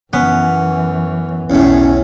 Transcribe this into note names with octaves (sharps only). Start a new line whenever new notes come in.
F#2 E3 B3 C#4
B1 E2 A2 C#4